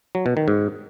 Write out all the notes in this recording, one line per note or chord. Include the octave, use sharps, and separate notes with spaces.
F#3
B2
D#3
G#2